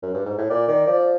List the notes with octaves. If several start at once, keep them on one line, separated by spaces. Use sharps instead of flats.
F#2
G2
G#2
A2
A#2 D5
D#3 D5
F3 D5